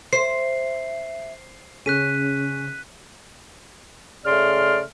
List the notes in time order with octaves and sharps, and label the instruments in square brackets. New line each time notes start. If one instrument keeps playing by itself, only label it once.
[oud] C5 [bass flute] E5 [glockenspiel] C7
[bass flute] C#3 [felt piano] C#4 G#4 [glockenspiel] F#6 B6 D#7
[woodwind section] C#3 A3 D5 C6 F6